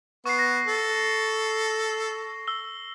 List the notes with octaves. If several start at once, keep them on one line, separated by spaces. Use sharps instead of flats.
B3 C#6 C7
A#6
A4
E6 G7